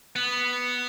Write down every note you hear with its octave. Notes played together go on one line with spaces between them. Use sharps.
B3